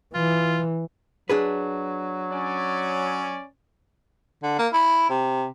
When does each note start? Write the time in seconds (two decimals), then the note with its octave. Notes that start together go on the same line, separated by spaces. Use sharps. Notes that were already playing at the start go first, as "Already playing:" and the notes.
0.14 E3 F4
1.30 F#3 D4 G#4 B4
2.31 C#4 D5
4.43 D3
4.59 A#3
4.73 E4
5.10 C3